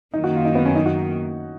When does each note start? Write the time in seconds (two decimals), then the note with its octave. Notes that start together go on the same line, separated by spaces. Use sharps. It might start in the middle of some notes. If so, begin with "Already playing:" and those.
0.14 F#2 D#3 A#3 D#4
0.24 F#4
0.35 F4
0.45 D#4
0.55 B3
0.66 C#4
0.75 D#4
0.86 F#4